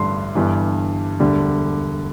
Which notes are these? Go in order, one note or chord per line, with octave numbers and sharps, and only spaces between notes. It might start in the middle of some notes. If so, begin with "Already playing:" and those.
Already playing: A1 G2 D3 G3 C6
G1 G2 E3 G3
E1 D2 D3 G3